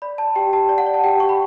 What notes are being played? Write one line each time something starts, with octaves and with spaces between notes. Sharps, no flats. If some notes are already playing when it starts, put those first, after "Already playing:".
D5 B5
D5 A5
G4 G5
G4 A5
D5
F#5
D5
A5
G4 G5
G4 C#6
B5